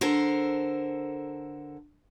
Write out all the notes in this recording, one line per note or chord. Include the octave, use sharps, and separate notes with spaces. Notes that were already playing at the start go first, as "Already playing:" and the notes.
D3 A4 A#4 C5